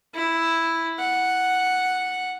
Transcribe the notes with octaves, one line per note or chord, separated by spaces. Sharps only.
E4
F#5